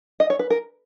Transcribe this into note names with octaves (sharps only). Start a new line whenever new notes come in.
D#5
C#5
B4
A#4